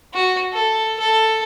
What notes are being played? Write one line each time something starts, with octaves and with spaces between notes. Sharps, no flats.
F#4
A4
A4